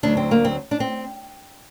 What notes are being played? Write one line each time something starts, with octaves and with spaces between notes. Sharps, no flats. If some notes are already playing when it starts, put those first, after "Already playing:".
D2 D3 F#3 D4
C4
A#3
C4
D4
C4